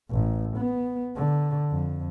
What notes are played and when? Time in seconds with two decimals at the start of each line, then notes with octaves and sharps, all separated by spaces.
0.10 A1
0.57 B3
1.16 D3
1.72 F2